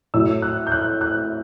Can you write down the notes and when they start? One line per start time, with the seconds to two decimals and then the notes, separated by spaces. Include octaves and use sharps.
0.14 A2 F#3 E6
0.42 F#6
0.67 G6
0.72 F#6
1.01 F#6